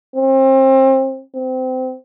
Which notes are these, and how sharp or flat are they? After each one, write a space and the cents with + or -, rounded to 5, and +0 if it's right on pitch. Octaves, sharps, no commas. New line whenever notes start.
C4 +30
C4 -25